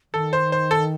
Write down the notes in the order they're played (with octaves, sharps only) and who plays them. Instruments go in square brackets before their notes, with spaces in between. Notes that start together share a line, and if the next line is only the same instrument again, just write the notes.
[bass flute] D#3 [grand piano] A4
[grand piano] C5
C5
A4